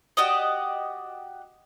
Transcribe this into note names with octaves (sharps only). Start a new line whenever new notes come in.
F#4 G4 D5 D#5